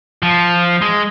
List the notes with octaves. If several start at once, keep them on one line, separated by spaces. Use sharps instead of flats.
F3
G#3